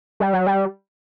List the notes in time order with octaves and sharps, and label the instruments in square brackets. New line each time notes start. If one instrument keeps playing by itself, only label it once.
[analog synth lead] G3
F#3
G3